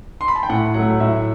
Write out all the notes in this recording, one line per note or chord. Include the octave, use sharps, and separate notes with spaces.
C6
B5
A5
G5
A2 F#5
F#3 A3 F#5
A2 E5